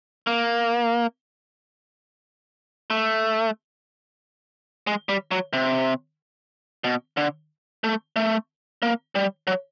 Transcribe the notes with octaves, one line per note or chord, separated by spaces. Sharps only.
A#3
A3
G#3
G3
F#3
C3
B2
D3
A3
A3
A#3
G3
F#3